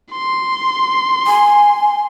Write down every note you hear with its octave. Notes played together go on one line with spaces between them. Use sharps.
C6
G#5